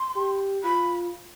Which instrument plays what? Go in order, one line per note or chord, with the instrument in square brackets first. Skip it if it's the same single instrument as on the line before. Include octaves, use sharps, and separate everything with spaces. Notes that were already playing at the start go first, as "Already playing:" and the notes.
Already playing: [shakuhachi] C6
[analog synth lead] G4
[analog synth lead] F4 [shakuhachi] B5